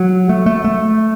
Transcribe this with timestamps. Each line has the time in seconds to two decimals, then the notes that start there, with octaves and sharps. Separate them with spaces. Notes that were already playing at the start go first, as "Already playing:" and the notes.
Already playing: F#3
0.29 A3
0.46 A3
0.64 A3